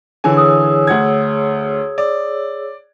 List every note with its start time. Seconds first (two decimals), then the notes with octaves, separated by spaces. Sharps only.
0.24 D3 E3 G#4 C#5 G#5 E6
0.37 D#6
0.87 D2 F#5 G#6
1.98 D5